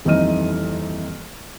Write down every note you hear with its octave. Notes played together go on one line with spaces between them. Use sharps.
D#1 F2 E3 D#4 F6 D#7